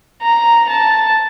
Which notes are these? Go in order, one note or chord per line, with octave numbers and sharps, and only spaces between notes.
A#5
A5